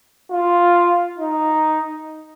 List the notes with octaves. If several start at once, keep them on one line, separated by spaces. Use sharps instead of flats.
F4
D#4